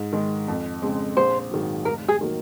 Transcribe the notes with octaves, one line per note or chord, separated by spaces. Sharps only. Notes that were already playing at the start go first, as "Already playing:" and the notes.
Already playing: G#2
D#3 G#3
F2
C#3 G#3 C4
A#1 C5
G#2 D#3 F#3
F1 A#4
G#4
D#3 F#3 A#3